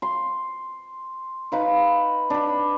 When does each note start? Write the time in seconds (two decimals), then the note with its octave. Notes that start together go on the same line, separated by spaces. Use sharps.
0.02 C6
1.52 D#4 B4 F5
2.30 D4 B5